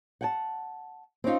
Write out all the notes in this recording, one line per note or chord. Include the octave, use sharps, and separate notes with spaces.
F#5 G5 A5
C4 C#4 D#4 F4